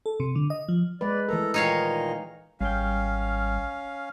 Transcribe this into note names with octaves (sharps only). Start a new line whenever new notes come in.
A4
C3
D3
D#5
F3
G#3 B4 D5
E3 A3 A4 A#4 A#5
A#2 D#3 D#4 C#5 D#5 F5
G#1 G3 C#4 G#4 F5 G5